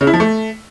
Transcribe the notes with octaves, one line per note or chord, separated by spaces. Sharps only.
C#3
E4
F3
A3